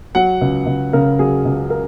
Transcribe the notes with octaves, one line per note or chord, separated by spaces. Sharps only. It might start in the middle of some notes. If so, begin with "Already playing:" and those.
F#3 F#5
C#2
C#2
C#3 A#4
F#3 G#4
C#2
A#4